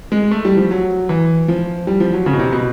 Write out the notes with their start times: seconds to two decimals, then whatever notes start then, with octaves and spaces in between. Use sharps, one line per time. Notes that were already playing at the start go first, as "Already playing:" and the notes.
0.12 G#3
0.31 A3
0.45 G3
0.57 F3
0.71 F#3
1.09 E3
1.48 F3
1.87 G3
2.00 F3
2.13 F#3
2.26 C#3
2.33 B2
2.39 C3
2.52 B2